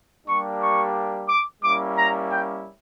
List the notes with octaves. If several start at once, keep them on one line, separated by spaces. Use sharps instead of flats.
G3 A#3 D4 G4 C#6
C#6
D6
G3 A#3 C#4 E4 D6
A#5
G5